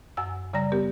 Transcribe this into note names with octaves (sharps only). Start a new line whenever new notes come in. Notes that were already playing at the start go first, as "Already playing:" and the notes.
F#2 F#5 G#5 E6
C#3 G3 D5 A#5 A#6
B3 G4 A#4